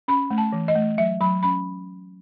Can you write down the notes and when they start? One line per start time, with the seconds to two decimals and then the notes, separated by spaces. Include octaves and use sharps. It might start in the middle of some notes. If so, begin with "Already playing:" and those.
0.08 C#4 B5
0.30 A3
0.38 A5
0.52 E3
0.68 D#5
0.75 A3
0.98 F#3 E5
1.21 F#3 B5
1.43 C#4 B5